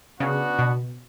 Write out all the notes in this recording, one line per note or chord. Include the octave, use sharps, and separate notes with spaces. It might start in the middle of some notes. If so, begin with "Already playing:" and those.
C#3 B3 D4 F#4
B2